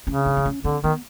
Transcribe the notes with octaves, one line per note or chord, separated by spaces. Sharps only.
C#3 C#4
D4
C4
C#4
D3 C4
D#3 B3